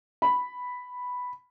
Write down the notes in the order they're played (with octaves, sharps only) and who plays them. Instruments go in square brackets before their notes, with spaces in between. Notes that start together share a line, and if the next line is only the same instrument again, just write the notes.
[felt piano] B5